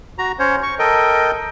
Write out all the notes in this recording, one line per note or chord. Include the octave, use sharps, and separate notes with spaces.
F#4 A#5
C#4 C5 C#5
C#6
A4 A#4 D#5 G5